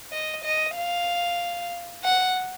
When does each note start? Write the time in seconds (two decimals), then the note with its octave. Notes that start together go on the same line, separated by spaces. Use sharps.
0.12 D#5
0.44 D#5
0.77 F5
2.04 F#5